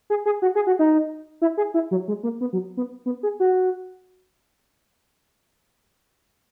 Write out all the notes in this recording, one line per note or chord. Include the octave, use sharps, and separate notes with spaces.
G#4
G#4
F#4
G#4
F#4
D#4
E4
G#4
E4
F#3
G#3
A#3
B3
F#3
B3
B3
G#4
F#4